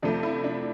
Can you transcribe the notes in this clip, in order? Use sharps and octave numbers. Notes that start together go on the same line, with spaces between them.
F2 C3 F3 A3 D4
E4
D4